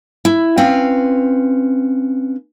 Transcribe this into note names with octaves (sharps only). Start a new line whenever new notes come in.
E4
C4 C#4 B4 F5